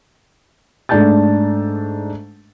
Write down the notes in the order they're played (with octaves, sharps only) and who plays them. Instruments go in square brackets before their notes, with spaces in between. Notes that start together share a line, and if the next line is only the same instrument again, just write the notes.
[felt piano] G#2 A3 D4 A5 G6 A6